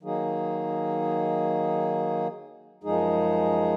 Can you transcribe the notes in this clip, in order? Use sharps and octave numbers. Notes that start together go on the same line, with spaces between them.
D#3 F#3 A#3 D#4 G#4
F#2 F3 G#3 D#4 G#4